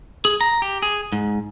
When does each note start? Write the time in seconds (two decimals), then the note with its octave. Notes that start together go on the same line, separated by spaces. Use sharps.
0.25 G#4
0.41 A#5
0.62 G4
0.82 G#4
1.12 G#2